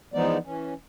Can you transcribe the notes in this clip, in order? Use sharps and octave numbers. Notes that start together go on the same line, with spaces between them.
E3 F3 G#3 B3 D#4 D5
E3 C#4